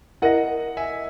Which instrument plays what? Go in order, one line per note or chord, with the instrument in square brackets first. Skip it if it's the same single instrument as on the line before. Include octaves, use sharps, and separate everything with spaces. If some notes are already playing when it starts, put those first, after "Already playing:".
[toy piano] E4 A#4 E5 [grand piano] D#5 F#5
[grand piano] E5 G#5